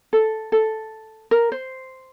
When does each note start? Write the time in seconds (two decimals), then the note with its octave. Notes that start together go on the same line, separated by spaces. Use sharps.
0.13 A4
0.52 A4
1.31 A#4
1.52 C5